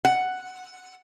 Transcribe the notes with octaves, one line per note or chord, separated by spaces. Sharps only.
F#5